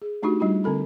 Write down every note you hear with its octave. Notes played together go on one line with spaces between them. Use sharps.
G#4
A3 D4 D#4 F#4 G4
G3 D4 D#4 F4
D3 C4 A4 B5